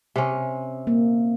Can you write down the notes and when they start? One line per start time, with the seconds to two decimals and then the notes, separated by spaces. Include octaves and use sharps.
0.16 C3 C#4
0.87 A#3